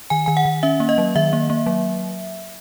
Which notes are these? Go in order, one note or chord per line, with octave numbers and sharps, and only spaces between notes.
D#3 G#5
D#3 G#5
F#5
D#3
C#4 E5
A#3
D#5
F#3
D#3 E5
A#3
A#3
F#3